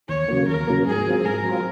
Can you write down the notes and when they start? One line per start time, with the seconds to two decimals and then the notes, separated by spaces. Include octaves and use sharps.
0.08 D#2 C#5
0.28 C#3 F#3 A#3
0.48 D#2 A#4
0.67 C#3 F#3 A#3
0.87 G#2 G#4
1.06 F#3 C4 F4
1.25 G#2 A#4
1.45 F#3 C4 F4